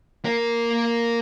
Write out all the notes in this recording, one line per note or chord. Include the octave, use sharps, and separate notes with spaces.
A#3 A#4